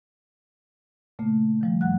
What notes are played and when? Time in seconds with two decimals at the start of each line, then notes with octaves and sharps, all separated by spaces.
1.19 A#2 C#3 A3 A#3
1.61 D#3 F3 G3
1.81 F#2 G3 F#5 F#6